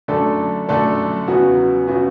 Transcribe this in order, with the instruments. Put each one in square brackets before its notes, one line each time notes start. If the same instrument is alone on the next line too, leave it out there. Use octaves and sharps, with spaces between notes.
[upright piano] F#2 D3 A3 D4 A4
F#2 D3 A3 D4 A4
E2 C#3 F#3 B3 F#4
C#3 F#3 B3 F#4